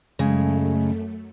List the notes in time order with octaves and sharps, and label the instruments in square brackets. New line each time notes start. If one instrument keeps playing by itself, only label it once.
[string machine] F#2 A3 [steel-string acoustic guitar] C#3 G#3